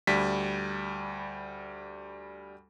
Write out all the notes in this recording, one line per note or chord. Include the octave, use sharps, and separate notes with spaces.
D2 G3 B6